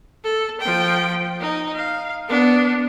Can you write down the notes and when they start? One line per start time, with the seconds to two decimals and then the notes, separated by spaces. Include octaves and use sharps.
0.24 A4
0.61 F3 G5
1.40 D#4
1.75 F5
2.28 B3 D4